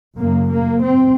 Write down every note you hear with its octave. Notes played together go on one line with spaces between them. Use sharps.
F#2 C#3 A#3
A#3
C4